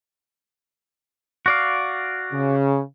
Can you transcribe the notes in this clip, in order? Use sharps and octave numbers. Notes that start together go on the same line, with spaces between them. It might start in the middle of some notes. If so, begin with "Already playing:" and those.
F#4 D5 F5
C#3